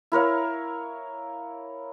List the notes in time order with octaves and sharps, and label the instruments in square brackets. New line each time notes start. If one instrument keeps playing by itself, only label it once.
[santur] E4 A#4 C#5 F5